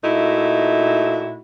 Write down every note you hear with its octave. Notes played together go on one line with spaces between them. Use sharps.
A#2 A3 D#4 E4 F#4